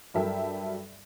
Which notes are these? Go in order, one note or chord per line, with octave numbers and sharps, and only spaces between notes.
G2 F#3 A4 A#4 E5 G5